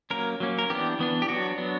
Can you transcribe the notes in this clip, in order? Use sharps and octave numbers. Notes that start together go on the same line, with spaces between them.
F#3 A#3 C#4 A#4
F#3 A#3 C#4
A#4
E3 B3 D4 G4
E3 B3 D4
G4
F#3 B3 D4 F#4
F#3 B3 D4